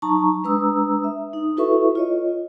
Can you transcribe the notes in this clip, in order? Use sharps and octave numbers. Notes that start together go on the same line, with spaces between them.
F#3 D#4 A5 A#5 C#6
G#3 D4 B4 A#5 D#6 E6
E5
D#4 D#6
E4 F#4 A4 B4 E5 C#6
F4 C#5 D#5